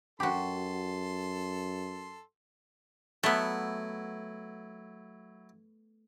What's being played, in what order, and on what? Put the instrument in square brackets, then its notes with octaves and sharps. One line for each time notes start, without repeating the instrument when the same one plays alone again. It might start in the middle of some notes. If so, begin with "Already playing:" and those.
[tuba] F#2 [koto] F#4 G4 [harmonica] A4 C6
[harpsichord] F#3 E4 [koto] A3 B3